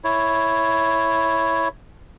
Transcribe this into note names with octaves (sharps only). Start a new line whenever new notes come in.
E4 C#5